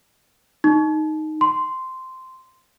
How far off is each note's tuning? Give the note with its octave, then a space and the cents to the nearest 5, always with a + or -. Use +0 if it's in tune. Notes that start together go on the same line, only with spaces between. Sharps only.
D#4 +0
C6 -10